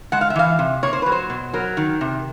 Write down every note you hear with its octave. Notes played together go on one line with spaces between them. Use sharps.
G#3 F#5
F5
E5
E3 F5
C3
A#3 C#5
C5
F#3 B4
C5
B2
F#3 A#4
D#3
C3